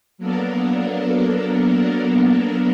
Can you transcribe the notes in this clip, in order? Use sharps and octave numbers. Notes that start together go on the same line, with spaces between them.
F#3 A#3 B3 D4 A4 A#4